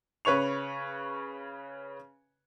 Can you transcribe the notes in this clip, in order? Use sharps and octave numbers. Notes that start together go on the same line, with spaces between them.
C#3 B4 C#5 C#6 F7